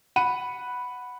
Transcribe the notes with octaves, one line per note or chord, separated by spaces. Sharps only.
F#5 B5 D#7